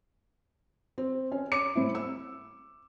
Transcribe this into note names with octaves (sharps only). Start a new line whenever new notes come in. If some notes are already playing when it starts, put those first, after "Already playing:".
C4
C#4
C#5 D6 C#7
A2 C4 E4
E6